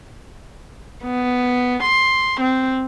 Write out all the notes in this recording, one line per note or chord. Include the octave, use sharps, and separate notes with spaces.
B3
C6
C4